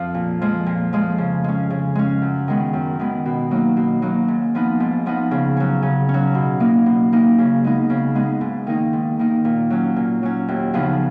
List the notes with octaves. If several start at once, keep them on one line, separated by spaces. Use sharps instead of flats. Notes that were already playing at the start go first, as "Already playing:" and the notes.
Already playing: F2 F3
A#2
F3 G#3
A#2
F3 G#3
C#3
G#3 C#4
C#3
G#3 C#4
F#2
D#3 G#3 B3
F#2
D#3 G#3 B3
B2
F#3 A#3 D#4
B2
F#3 A#3 D#4
G#2
F3 B3 D#4
G#2
F3 B3 D#4
C#3
F#3 C#4
C#3
C#4
F#3
B2
A#3 D#4
B2
A#3 D#4
C#3
G#3 B3 D#4
C#3
G#3 B3 D#4
G#2
D#3 A#3 D#4
G#2
D#3 A#3 D#4
A#2
F#3 C#4
A#2
F#3 C#4
D#2
C#3 F3 B3 D#4